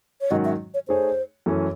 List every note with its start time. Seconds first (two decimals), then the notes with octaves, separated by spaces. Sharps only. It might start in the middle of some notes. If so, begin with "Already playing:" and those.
0.21 C#5
0.31 G#2 D#3 F#3 C#4 F#4 D#5
0.45 E5
0.74 C#5
0.88 A3 D#4 G#4 C5 C#5
1.46 F#2 E3 A3 C#4